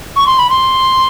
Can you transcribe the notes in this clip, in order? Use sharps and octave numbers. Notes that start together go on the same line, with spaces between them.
C#6
C6
B5
C6